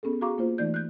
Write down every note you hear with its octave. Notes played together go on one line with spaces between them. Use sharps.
B3 C#4 G#4 A4
F#4 G#4 F5 A#5 C#6 D6
A#3 F4 C5
E3 A3 D#4 D5 G6
F#6 G6